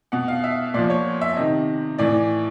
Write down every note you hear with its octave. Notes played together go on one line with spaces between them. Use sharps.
B2 F#5
F5
E5
A#2 F3 D5
C#5
E5
C3 D#3 D#5
A2 E3 D5